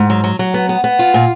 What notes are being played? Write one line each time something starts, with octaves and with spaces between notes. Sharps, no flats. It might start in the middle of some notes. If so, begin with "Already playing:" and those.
Already playing: G#2
F#3
F#3
F#3
B3
B3
B3
F4
A#2